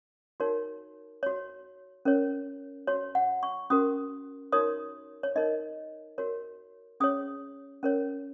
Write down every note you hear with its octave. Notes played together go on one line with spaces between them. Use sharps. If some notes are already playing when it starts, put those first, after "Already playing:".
D#4 F#4 A#4 C#5
F#4 C#5
C#4 A#4 C#5
F#4 C#5
F#5
C#6
C#4 F#4 A#4 D#6
D#4 F#4 A#4 C#5 D#6
C#5
D#4 A#4 C#5 D#5
F#4 A#4 C#5
C#4 G#4 C#5 D#6
C#4 A#4 C#5